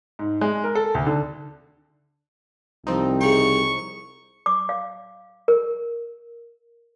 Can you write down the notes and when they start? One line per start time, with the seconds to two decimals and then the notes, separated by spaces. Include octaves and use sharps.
0.19 G#2
0.41 G#3
0.64 A#4
0.75 A4
0.95 D2
1.07 D3
2.87 C2 F3 C4 D#4
3.21 C#3 G5 C#6
4.46 D6
4.69 F5
5.48 A#4